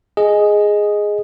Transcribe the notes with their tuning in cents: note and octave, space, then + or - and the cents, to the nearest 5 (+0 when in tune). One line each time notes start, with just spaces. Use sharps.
G#4 +0 D#5 +0